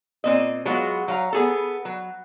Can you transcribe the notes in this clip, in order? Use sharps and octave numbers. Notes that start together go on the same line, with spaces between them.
A#2 C4 D#5
F#3 G#3 B3 F4 F#4
F#3 C#5 F5 A#5
B3 G#4 A4
F#3